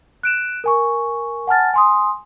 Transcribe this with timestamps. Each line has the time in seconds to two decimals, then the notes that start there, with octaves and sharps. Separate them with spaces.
0.23 F#6 D7 E7
0.64 A#4 G#5 C#6
1.47 F#5 G#5 A5 F6 A6
1.74 G#5 C6 D#6